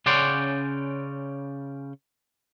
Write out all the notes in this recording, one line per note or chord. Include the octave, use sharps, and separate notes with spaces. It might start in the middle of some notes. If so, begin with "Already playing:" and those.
C#3 C#4 D5 F#5 G5 C6